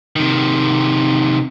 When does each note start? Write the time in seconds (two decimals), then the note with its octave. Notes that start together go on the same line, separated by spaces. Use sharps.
0.16 C3 D#3